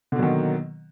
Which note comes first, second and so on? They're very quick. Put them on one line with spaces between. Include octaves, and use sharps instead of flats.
D3 B2 F#3 D#3 A#3